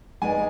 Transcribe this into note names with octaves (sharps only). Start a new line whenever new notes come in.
G#3 D#4 G#4 B4 D5 G#5